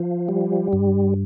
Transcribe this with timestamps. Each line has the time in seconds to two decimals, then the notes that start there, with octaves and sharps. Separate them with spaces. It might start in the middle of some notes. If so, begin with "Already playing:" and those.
Already playing: F3
0.29 G3
0.73 G2